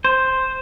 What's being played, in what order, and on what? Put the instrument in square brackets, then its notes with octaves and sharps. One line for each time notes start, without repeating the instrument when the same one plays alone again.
[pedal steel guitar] C5